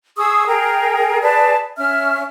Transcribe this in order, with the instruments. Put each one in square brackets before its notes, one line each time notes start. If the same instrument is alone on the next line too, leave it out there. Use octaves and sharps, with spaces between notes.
[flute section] G#4 C#6 D#6 E6
G#4 A#4 G5
G#4 B4 D5 A5
C#4 E5 F6